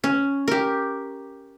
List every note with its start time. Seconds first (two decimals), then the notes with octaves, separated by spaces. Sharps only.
0.04 C#4
0.48 G4 A#4